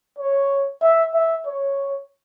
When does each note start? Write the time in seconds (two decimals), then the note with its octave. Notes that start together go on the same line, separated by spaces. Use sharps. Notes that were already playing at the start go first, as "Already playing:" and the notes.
0.18 C#5
0.82 E5
1.14 E5
1.46 C#5